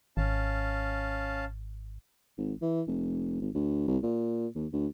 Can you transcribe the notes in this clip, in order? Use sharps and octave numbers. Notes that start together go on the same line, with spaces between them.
G#1 C#4 F5 A5
G#1
E3
F1
G#1
D2
C2
A#2
D#2
D2